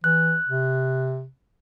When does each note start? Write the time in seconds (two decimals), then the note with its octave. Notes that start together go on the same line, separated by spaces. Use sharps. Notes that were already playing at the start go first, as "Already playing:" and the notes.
0.04 E3 F#6
0.49 C3